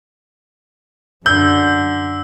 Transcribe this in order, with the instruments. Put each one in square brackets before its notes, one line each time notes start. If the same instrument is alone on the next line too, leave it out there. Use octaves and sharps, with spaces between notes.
[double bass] F#2 [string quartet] D3 [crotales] E6 [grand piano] G6